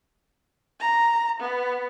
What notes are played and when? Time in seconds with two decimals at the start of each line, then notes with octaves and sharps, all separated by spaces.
0.80 A#5
1.40 B3